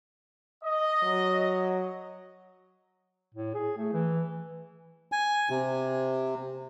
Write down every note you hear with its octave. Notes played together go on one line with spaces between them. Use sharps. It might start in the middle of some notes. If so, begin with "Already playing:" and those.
D#5
F#3
A2
G#4
A3
E3
G#5
C3